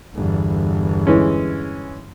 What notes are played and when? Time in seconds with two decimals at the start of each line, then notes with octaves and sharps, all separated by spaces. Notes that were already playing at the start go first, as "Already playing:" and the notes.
0.15 G1 E2
1.07 E3 G#3 C#4